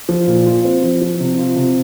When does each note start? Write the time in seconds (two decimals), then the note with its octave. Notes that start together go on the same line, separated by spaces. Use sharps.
0.09 F3
0.27 A#2
0.46 F4
0.64 C4
0.83 F3
1.01 F3
1.20 C3
1.38 F4
1.56 C3